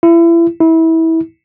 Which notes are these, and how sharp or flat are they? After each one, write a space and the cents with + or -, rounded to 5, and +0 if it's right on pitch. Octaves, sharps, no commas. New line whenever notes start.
E4 +30
E4 -25